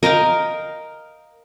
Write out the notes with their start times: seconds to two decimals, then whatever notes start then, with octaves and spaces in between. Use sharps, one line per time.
0.03 A#4 D#5 F5 G5